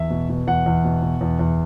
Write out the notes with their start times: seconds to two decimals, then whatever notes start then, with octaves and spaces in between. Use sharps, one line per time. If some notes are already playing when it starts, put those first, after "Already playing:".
Already playing: E2 E5
0.11 B2
0.29 B2
0.47 E2 F#5
0.66 E2
0.84 B2
1.02 B2
1.21 E2
1.39 E2